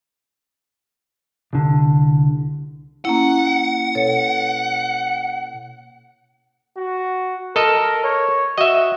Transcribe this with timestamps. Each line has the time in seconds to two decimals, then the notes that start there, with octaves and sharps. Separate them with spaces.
1.53 C2 D3
3.05 A#3 C#4 E4 F#5
3.95 B2 A4 C#5
6.77 F#4
7.56 A4 A#4 D#5
8.04 C#5
8.58 F#4 D#5 E5